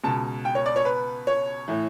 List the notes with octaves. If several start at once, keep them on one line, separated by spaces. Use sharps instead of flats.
C#2 B2 A5
G5
C#5
D5
C#5
B4
C#5
A2 E3